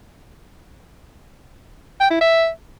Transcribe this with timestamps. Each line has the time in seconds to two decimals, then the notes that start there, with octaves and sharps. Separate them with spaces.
2.00 G5
2.11 E4
2.21 E5